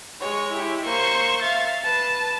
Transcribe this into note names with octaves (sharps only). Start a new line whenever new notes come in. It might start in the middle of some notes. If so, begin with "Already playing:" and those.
G#3 C#5
E4 G4
A#3 C5 C#6
E5 F5 A6
B4 A5